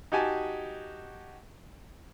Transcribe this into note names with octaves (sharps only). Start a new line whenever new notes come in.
D#4 F#4 G4 G#5 A5